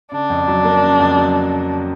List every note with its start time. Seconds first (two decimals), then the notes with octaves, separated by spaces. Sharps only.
0.12 C#3 D4
0.30 F2
0.48 F#3
0.64 A#3
0.83 C#3
1.00 F2
1.17 F#3